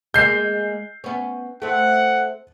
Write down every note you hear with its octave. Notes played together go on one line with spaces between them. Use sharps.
G#3 A#3 G6 C7
B3 C#4
A3 C4 F#5